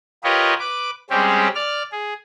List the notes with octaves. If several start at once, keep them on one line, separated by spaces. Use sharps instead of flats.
F4 G4 A#4 B4 C#5 D#5
B4 D6
G3 G#3 C4 C#4 G4 G#4
D5 F6
G#4